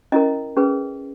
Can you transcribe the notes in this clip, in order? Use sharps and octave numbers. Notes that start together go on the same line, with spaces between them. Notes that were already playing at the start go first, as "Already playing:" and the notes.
C#4 E4 A#4 D#5
C#4 G#4 B4